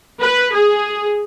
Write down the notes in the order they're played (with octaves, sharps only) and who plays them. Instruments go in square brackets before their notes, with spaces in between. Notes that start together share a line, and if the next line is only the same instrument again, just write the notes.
[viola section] B4
G#4